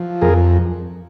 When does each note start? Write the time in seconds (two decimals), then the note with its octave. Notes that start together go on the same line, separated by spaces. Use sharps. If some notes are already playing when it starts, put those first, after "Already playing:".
Already playing: F3
0.21 F2 G#4 A#4